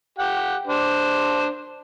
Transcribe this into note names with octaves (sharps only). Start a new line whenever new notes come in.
G4 F#5 G5
D4 C5